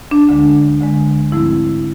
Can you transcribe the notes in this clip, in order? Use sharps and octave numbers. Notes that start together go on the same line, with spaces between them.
D4
D2 D3 G#3
D2 D3 G#3
G#2 F3 A3 C4 E4